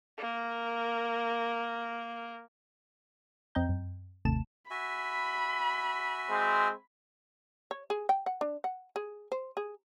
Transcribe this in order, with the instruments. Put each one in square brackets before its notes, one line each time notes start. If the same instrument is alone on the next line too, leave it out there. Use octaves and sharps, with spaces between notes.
[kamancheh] A#3 A#4
[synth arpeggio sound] F2 C4 D#5 G5 A#5 G6
F#2
G#1 D#2 C3 A3 A5 E7
[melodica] F#4 E5 G#5 [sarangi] B5
[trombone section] G#3 C4
[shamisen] C#5
G#4
G5
F#5
D4
F#5
G#4
C5
G#4